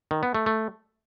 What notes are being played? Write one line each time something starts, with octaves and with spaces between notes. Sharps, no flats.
D#3
B3
A3
A3